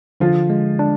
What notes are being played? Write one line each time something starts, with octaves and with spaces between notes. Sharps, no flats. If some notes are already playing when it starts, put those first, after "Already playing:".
D3 F3 F4
G#3
D4